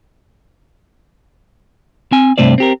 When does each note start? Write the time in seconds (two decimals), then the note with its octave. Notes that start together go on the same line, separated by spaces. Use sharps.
2.12 C4 G#5
2.38 G2 C3 A3 C5 D5
2.58 C4 G4 A#4